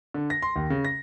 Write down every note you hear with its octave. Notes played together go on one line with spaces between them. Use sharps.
D3
A#6
C6
D#2
C#3
A#6